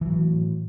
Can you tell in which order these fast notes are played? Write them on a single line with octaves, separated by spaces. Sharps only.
E3 F#3 A2